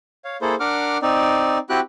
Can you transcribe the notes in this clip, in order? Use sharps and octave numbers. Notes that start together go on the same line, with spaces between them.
C#5 F5
A#3 E4 G#4 A4 C5
D4 A#4 F#5 D6 F6
C4 D#4 D5
C4 E4 F#4 G4 G5 F#6